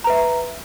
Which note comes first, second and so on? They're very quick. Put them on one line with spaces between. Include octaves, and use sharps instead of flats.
A#5 B4 E5